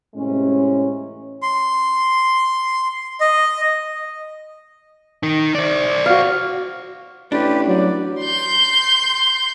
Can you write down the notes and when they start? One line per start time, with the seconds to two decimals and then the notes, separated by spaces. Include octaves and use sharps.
0.15 A2 C3 E3 G#3 C#4
1.42 C6
3.20 D#5
5.23 D#4 A#4
5.55 C5 D5
6.06 F#4 F5
7.32 A1 D4 G4 B4
7.68 F#3 D5
8.22 C6 G6